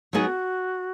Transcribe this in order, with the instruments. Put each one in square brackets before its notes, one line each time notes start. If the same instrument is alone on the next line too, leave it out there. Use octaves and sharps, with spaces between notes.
[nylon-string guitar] F#3 B3 D#4 G#4 [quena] F#4